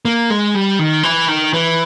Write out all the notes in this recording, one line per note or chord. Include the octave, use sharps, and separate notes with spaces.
A#3
G#3
G3
D#3
E3
D#3
E3